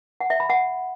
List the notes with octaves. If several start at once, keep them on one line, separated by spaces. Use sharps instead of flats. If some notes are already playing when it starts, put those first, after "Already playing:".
F#5
E5
B5
F#5